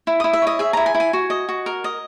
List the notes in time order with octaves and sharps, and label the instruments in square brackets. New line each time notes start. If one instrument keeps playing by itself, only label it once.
[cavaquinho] E4
E4 D#6
E5
C#5 D#5
G#4 E5
E4 A#5
G#5
E4
G#5
F#4
D#5
F#4
A#4
D#5